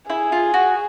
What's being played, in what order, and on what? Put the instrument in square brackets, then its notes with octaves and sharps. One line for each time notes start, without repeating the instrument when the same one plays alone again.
[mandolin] E4 [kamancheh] G#4
[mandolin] F4
F#4